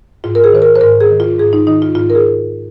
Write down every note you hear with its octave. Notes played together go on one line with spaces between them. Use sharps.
G#2 F4
A#4
G#4
D#3 C5
A#4
C5
G#2 A#4
G#4
D#3
F4
G#2 G#4
D#4
D#3 D#4
F4
G#2 F4
A#4
G#4